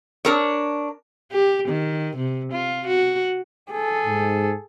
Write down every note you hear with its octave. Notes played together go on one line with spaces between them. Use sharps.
D4 A#4 C#5
G4
D#3
C3
F4
F#4
G#4 A4
G#2